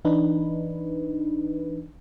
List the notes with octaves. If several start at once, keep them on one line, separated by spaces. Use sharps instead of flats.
E3 D4 D#4 B4